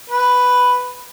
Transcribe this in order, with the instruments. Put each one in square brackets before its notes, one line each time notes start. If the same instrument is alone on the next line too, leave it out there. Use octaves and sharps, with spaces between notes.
[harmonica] B4